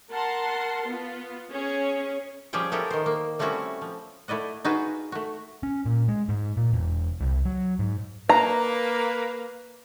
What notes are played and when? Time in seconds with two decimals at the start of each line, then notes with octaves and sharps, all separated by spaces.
0.12 A#4 F#5 A5 C6
0.88 B3 F4
1.50 C#4 G#4 C#5
2.53 F3 G3 C#4 G4 G#4 G5
2.72 B3 C#4 E4 G4 A4 A#4
2.91 D#3 C5
3.06 A#3
3.39 G3 A3 C4 C#4 E4 F#4
3.81 F3
4.28 A3 E4 D5 D#5 F#5
4.64 D#4 F4 F#4 G#4 B4
5.12 A3 F#4
5.63 C#4
5.85 A#2
6.08 G#3
6.29 G#2
6.57 A#2
6.73 E1
7.21 C2
7.45 F#3
7.79 G#2
8.29 A#3 B4 A#5